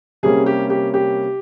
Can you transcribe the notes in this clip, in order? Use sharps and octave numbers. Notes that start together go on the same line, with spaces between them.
C3 G3 A#3 C#4 G#4
G4
G4
G4